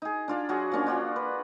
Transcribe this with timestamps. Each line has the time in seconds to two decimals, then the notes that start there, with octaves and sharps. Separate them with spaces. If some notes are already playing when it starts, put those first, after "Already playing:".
0.02 D#4 G#4
0.28 D4 F4 D5
0.49 F#3 F#4 G#4
0.72 F3 A#3 C#4 D4
0.87 D4 F4 F#4
1.16 B4